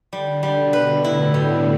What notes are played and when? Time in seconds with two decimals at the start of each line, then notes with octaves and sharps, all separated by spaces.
0.13 D3 G3
0.43 G3
0.59 B2
0.73 B4
1.04 A2 E4
1.34 G3